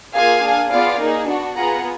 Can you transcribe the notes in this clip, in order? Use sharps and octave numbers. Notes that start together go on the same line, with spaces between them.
A#3 F4 G#4 F5 G#5
D4 G#4
B3 F4 G#4 D5 F5
A#3 D#4 G#4
B3 D4 F#4
B3 F4 G#4 F#5 A#5